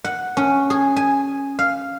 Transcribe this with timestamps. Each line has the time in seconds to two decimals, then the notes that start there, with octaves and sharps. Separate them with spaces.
0.05 F#5
0.37 C#4
0.70 G#4
0.96 G#5
1.59 F5